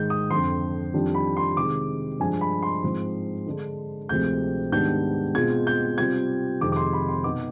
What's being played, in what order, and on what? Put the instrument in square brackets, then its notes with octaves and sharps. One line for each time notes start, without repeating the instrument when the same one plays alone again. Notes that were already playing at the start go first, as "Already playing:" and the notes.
Already playing: [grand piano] G#2 D#3 G#3 G6
D#6
F2 D3 F3 C6
F2 D#3 G3 D4 F4
B5
C6
C3 D#3 G#3 D6
G2 F3 G#3 D4 G#5
B5
C6
G#2 F3 C4
D3 G#3 D4
D2 C3 F3 G#3 C4 G6
G#2 D#3 G3 B3 D4 G6
B2 G#3 C4 F4 G#6
G6
C3 G3 C4 F4 G#6
F2 C3 D#3 G#3 D6
D6
C6
B5
C6
B2 B3 D#4 D6